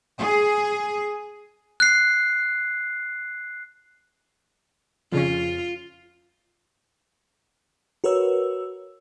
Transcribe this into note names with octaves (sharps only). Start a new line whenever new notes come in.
G#4
F#6 C7
F2 C#3 C#4 F4
F#4 A#4 B4 C#5 E6